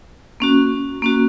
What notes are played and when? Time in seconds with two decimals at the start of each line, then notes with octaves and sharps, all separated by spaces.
0.40 A#3 C#4 F#4
1.02 A#3 C#4 F#4